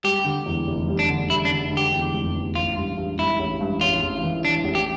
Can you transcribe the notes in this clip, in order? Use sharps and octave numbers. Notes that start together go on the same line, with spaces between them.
G3 G4
D3
E2
F1
G3
D4
D3
G3 E4
D4
D3
D3
G4
E2
F1
E2
A1 F4
G2
G2
G2 E4
A1
G2
A1 F4
A1
E3
E3 D4
A1
G4